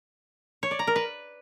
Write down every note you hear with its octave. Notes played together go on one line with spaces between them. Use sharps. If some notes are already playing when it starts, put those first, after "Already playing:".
C#5
D5
A#5
A#4
B4